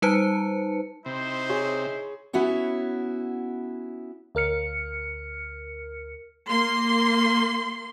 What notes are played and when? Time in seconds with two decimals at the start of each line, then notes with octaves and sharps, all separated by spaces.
0.02 G3 D#4 B4 C5 A5 C#7
1.06 C3 D#4 E4 C5
1.49 G#4 C#5
2.33 B3 C#4 E4 F#4 C#5
4.35 D2 A#4 F6 C#7
6.47 A#3 C6